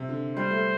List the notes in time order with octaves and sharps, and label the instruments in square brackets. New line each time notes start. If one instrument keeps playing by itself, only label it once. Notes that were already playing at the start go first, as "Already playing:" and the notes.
Already playing: [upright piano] C3
D3
[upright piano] G3 [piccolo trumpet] C5
[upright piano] A3